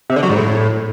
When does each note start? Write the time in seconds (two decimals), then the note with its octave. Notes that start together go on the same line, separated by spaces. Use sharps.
0.10 C3
0.16 D3
0.23 F#3
0.29 G#2
0.36 A2